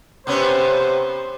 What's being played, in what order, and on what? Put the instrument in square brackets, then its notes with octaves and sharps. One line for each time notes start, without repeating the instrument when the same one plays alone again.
[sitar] C3 B3 C#4 [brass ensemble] C5